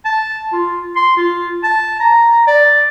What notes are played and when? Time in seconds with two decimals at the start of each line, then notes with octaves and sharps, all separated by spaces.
0.05 A5
0.53 F4
0.96 C6
1.17 F4
1.63 A5
2.00 A#5
2.47 D5